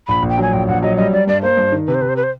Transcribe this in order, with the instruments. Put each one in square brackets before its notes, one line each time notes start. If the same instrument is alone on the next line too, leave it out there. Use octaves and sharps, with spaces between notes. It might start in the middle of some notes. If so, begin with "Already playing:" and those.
[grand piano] A#1 [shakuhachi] B5
[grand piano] A#1
[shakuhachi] G5
[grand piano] F#3 [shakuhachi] G#5
[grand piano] A#1 [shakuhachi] G5
[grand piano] A#1 [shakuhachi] F#5
[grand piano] F#3 [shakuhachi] D#5
[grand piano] G3 [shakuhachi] D#5
[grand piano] G3 [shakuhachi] D5
[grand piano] G2 [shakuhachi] D5
[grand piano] A#3 [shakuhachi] C5
[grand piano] G2
D#3
[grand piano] C3 [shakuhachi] B4
[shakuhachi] C5
[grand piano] C3 [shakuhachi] B4
[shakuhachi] C5
B4
C5